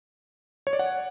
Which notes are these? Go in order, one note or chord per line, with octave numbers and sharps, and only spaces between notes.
C#5
D5
F#5